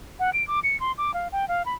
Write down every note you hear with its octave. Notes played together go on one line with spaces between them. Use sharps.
F#5
D7
D6
C#7
C6
D6
F5
G5
F5
B5